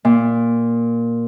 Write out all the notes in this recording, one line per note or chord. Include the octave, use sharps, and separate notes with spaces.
A#2